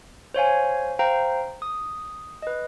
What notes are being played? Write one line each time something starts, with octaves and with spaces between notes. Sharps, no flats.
C5 C#5 F5 G#5
C5 F5 G5 A#5
D#6
B4 D#5